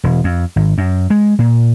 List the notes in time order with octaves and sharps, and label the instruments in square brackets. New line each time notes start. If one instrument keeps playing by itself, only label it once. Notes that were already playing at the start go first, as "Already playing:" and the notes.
[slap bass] E1
F2
G#1
F#2
G#3
A#2